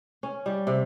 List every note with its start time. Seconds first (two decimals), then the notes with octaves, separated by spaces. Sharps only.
0.23 C#4
0.46 G3
0.67 C3